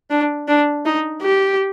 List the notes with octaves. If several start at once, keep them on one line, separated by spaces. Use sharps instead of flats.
D4
D4
D#4
G4